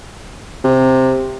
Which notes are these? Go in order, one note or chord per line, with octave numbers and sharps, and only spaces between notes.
C3